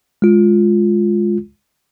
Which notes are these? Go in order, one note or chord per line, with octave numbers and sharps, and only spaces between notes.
G#3 F4